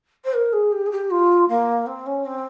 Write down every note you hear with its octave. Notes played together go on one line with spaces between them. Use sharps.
C5
A#4
G#4
G4
G#4
G4
F4
A#3
C4
C#4
C4